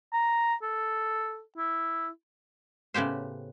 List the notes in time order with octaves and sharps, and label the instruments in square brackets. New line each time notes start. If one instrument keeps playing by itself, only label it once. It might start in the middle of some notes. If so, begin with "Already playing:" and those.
[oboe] A#5
A4
E4
[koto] A2 C#3 B3 G4 C5